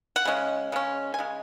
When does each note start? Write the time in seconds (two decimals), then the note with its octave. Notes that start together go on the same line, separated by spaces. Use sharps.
0.16 F#5
0.25 C#3 G#3 C#4
0.72 C#3 G#3 C#4
1.14 G#5
1.19 C#3 G#3